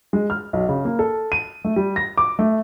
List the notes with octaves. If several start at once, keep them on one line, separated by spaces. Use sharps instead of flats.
G#3
F6
B1
C#3
A#3
A4
D#7
A3
G3
A#6
D6
A3